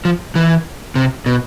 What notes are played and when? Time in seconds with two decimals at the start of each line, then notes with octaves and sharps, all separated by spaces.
0.05 F3
0.35 E3
0.95 C3
1.26 B2